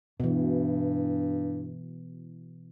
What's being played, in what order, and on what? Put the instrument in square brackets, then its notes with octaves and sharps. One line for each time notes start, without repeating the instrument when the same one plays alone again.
[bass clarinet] G2 [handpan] B2 E3